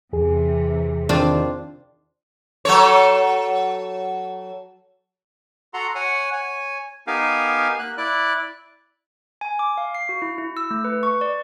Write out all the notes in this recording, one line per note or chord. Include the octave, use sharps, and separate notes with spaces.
E2 C3 E3 G#4
D#3 C4 D4 F4
F#3 A4 C#5
F#4 A4 F#5 A#5 C6
C#5 F#5 G#5
C#5 G#5
B3 D#4 G4 A#4 F5 G#5
A#3 F#6
E4 D5 F#6
G#5
D6
F5
C7
F#4
E4
E4
E6
A3
B4
C#6
D5